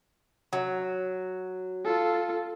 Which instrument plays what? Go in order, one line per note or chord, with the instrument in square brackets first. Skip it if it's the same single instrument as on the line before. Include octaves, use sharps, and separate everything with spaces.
[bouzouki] F#3
[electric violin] F4 A4